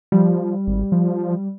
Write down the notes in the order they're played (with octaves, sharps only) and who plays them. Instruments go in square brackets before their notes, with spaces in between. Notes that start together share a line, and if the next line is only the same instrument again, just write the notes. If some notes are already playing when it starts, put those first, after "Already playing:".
[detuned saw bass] F3 [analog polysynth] G3
[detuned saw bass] G#1
F3